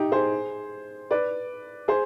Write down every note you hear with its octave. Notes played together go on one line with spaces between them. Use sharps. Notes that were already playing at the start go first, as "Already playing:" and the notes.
Already playing: D#4 G4
G#4 C5
B4 D5
G#4 C5